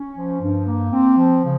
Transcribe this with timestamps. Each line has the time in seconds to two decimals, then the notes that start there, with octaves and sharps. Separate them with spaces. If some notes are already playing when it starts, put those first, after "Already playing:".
Already playing: C#4
0.16 F3
0.40 G2
0.66 A#3
0.91 C4
1.16 F3
1.41 C#3